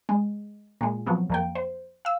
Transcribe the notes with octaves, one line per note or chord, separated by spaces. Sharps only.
G#3
A#2 G#3
F3 F#3 B3 C4
F2 A#3 G5
C5
F5 E6